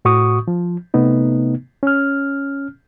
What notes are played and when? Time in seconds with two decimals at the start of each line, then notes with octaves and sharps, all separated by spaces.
0.05 A2 F#4 C#6 D#6
0.48 F3
0.94 C3 A3 B3 D#4
1.83 C#4 F6